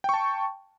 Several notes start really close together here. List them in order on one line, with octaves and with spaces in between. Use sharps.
G5 C#6 A5